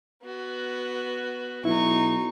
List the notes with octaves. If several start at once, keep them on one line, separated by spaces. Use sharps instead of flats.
B3 F#4
B1 D#4 E4 C#6